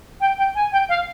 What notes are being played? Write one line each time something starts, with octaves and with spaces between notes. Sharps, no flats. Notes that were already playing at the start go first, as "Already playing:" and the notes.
G5
G5
G#5
G5
F5